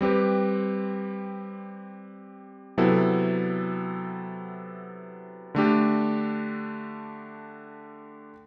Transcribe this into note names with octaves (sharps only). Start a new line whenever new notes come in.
G3 C4 G4 B4
C3 F#3 B3 E4 A4
D3 A3 D4 G4